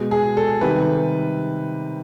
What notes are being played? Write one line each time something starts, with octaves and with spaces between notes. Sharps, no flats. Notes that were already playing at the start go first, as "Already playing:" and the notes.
Already playing: B2 G#3
G#4
A4
C3 D#3 G3 B4